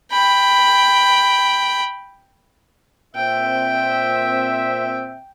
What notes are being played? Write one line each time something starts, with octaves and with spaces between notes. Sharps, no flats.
G5 B5
A#2 C4 E5 G5